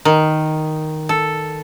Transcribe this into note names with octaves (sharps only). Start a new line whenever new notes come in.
D#3
A4